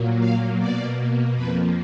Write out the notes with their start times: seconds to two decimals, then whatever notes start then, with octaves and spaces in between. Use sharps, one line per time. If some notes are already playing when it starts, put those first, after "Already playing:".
Already playing: A#2 F#3 A#3
0.19 F5
0.59 B2 A#3 D5
1.35 F2 F3 A#3 B4